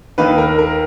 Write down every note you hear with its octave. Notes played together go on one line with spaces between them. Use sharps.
D#2 D#3 A#3 D#4 B4
A#4
A#4